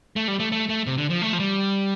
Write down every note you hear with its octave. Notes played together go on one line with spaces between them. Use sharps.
A3
G3
A3
A3
A3
C3
D3
F3
A3
F3
G3